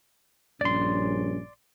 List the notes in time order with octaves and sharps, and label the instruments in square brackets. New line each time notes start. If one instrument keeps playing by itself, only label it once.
[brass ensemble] A#1 G2 C#4 [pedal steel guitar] D5 C6